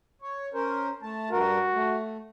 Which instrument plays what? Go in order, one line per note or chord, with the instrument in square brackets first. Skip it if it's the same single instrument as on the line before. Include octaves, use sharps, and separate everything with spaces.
[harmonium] C#5
C#4 A#4 C5
A3 A5
[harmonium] G2 A#4 [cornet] F#4
[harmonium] A3